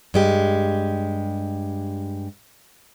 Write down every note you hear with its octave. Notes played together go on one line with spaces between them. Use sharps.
G2 G#3 G4